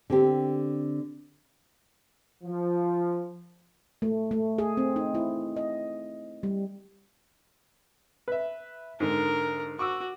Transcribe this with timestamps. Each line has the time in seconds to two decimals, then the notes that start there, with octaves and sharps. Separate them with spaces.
0.10 D3 C4 G4
2.44 F3
4.02 A3
4.31 A3
4.58 G#4
4.77 C4
4.96 D#4
5.15 E4
5.56 D#5
6.43 G3
8.28 B4 E5
9.00 G#2 D3 A#4
9.79 F#4 C#6 D6 E6